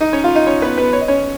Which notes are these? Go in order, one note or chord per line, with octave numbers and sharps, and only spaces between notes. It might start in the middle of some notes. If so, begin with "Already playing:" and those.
D#4 D#5
C#4 C#5
F4 F5
D#4 D#5
C#4 C#5
B3 B4
B3 B4
C#5
D#5
C#4 C#5